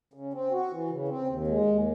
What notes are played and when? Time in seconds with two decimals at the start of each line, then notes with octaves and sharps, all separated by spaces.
0.14 C#3
0.34 C4
0.52 F#4
0.71 E3
0.90 C#3
1.08 C4
1.28 D#2
1.47 G#3
1.66 D#2